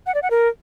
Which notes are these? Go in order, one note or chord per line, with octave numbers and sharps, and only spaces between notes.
F#5
D5
F#5
A#4